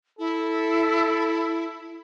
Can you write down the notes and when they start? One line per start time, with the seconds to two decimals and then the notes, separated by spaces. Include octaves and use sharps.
0.19 E4 A4